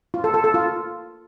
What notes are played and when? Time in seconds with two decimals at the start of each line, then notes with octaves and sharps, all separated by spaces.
0.14 F4
0.24 A4
0.34 A4
0.44 A4
0.54 F4